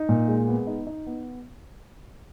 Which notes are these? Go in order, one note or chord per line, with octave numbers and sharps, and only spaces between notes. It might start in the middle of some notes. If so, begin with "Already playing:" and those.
Already playing: D#4
A#2
G#3
B3
D#4
D#4
B3